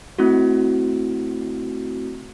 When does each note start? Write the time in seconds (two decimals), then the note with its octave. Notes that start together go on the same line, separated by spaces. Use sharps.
0.19 A3 C4 E4 F#4